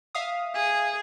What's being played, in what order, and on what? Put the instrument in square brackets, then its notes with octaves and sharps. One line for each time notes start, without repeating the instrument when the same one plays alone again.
[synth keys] E5 F5 D#6
[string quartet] G#4